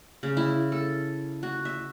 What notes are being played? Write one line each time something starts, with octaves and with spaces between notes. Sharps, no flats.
C#3
E4
A4
F#4
E5